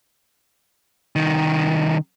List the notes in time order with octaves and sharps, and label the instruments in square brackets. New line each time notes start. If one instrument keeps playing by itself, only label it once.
[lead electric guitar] C2 D#3